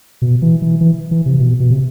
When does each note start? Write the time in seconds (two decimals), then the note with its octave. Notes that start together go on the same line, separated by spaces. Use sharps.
0.22 B2
0.42 E3
0.62 E3
0.81 E3
1.11 E3
1.26 C3
1.40 B2
1.60 B2
1.71 C3